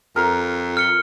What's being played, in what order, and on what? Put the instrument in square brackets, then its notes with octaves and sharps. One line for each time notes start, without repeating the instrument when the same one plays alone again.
[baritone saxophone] F2 [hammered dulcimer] A#4
[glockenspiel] F6 C#7 G7